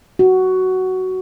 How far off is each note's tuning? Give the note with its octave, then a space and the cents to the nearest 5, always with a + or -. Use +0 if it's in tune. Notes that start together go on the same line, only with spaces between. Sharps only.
F#4 +10